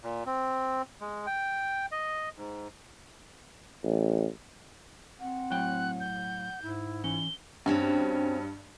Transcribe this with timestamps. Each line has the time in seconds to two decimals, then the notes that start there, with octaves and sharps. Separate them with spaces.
0.04 A#2
0.26 C4
1.01 G#3
1.27 G5
1.92 D#5
2.37 G#2
3.84 A1
5.19 C4 F#5
5.50 A2 F#3 G5 F#6
6.00 G6
6.62 G#2 E4
7.04 E3 C#4 G7
7.66 G2 C4 C#4 F#4